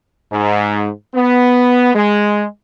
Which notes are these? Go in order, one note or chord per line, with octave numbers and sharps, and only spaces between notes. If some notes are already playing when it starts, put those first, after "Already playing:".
G#2
B3
G#3